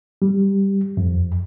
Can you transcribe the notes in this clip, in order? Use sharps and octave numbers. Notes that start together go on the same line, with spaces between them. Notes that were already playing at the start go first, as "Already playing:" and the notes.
G3
F2